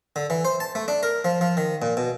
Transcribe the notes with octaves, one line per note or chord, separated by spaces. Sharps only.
D3
E3
C5
A5
A3
D4
A#4
F3
F3
D#3
A#2
B2